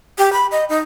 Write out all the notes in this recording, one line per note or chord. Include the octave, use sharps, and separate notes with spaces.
G4
B5
D#5
D#4